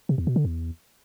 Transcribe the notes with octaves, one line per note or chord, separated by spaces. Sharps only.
C3
E2
B2
D3
E2